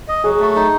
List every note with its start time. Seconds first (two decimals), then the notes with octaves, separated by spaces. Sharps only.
0.08 D#5
0.24 F#3 G#4
0.40 A3
0.55 D#4